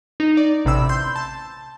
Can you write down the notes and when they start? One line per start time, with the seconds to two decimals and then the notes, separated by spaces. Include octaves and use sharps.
0.20 D#4
0.37 D5
0.65 A1 C3 B5 E6
0.89 C6 G6
1.16 A5